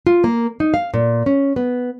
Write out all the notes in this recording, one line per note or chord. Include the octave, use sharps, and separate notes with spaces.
F4
A#3
D#4
F5
A#2
C#4
B3